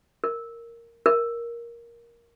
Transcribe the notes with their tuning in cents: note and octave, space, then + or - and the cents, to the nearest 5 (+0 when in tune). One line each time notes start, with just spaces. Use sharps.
A#4 -5
A#4 +10